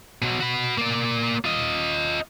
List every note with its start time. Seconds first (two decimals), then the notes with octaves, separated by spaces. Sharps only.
0.22 B2 F#3
0.41 F#4 B5
0.78 A#3 D5
1.45 F4 D#5